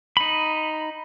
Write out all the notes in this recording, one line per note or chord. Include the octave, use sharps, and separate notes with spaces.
D#4 B5